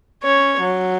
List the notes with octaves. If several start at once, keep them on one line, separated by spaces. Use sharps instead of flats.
C#4 C#5
F#3